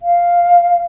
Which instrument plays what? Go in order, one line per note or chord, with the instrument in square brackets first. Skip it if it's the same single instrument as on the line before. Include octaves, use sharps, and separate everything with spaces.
[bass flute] F5